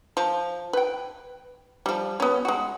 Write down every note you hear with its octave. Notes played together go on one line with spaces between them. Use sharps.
F3
B4 G5
F3 G3
B3 C#4
G#3 F#4